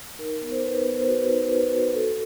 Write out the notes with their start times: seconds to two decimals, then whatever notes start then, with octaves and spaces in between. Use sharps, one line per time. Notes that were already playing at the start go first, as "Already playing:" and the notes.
0.19 D#4 A#4
0.41 B3
0.51 C5
0.63 D#4 B4
0.84 B3
0.99 C5
1.07 F#4 B4
1.29 D#4
1.51 F#4 B4
1.73 F#4
1.94 F#4 A4